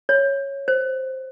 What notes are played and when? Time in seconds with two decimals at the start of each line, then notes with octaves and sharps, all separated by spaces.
0.09 C#5
0.68 C5